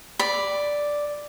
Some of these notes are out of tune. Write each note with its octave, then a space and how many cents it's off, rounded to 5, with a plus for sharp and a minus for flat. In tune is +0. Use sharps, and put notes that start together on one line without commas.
D5 +0 B5 +0